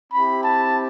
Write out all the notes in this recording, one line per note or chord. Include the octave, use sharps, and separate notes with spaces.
C4 E4 G4 B5
A5